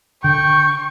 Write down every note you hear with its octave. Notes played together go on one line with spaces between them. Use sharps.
D3 G5 C#6